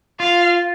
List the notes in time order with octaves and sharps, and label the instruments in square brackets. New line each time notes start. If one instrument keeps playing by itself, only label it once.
[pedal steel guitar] F4 [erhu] F5